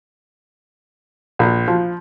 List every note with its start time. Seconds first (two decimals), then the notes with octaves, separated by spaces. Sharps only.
1.39 A#1
1.68 F3